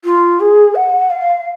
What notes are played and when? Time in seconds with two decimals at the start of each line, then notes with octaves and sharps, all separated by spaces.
0.04 F4
0.40 G#4
0.75 F#5
1.10 F5